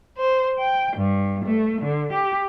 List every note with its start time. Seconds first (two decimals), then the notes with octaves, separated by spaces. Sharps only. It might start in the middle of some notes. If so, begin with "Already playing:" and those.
0.17 C5
0.59 G5
0.96 G2
1.45 A3
1.82 D3
2.13 G4